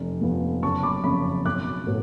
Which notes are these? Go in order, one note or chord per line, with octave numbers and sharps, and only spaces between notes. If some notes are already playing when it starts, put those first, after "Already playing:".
Already playing: F1
F2 F3 B3
F#1 A5 C#6
B5 D6
F2 C#3 B5 D6
B1 D6 F#6
A2 F#3 B3